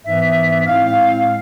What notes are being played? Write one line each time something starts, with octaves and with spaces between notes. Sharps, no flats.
G#2 E3 B3 E5
A2 G#3 C4 F5